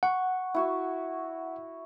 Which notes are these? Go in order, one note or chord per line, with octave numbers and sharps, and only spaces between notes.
F#5 C#6
E4 F#4 C#6